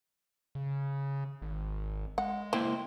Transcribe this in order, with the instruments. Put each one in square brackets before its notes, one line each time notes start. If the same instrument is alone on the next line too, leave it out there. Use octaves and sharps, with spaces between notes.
[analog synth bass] C#3
G#1
[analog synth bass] G#3 [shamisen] F#5
[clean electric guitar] A#3 E4 C5 [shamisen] C4